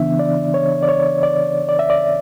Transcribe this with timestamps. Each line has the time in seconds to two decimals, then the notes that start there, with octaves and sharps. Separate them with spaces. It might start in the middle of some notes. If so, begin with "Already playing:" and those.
Already playing: C#3 E3 B3 D4 E5
0.19 D5
0.54 C#5
0.83 D5
0.89 C#5
1.23 D5
1.69 D5
1.79 E5
1.90 D5